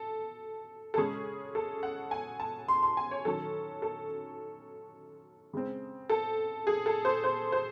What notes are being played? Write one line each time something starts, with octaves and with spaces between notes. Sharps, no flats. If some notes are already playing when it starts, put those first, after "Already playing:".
Already playing: A4
A4
C#3 G#3 C#4 G#4
A4
F#5
G#5
A5
C6
C6
G#5
C#5
D#3 F#3 C#4 A4
A4
C#3 G#3 C4
A4
G#4
A4
C5
C5
C5